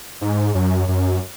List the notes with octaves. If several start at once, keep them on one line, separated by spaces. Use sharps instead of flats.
G#2
F#2
F#2